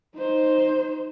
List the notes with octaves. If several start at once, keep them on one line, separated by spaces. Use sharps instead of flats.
D#4 C5